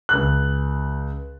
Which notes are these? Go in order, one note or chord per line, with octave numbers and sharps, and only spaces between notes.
C#2 F#6